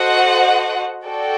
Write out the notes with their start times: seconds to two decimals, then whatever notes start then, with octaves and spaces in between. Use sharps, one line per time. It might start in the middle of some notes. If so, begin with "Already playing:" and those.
Already playing: F#4 A4 C5 D#5 F#5
1.06 F#4 A4 D5 G5